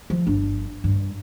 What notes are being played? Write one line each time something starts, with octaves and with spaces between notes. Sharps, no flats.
F3
G1 D4
G2